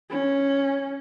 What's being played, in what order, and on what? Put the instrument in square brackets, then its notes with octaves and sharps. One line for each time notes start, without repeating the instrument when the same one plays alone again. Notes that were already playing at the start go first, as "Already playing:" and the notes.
[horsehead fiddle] C#4